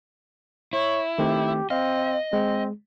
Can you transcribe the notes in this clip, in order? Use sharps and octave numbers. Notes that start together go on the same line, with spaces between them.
E4 C#5
D#3 A3 C4 G4
C4 D#5 F5
G#3 C4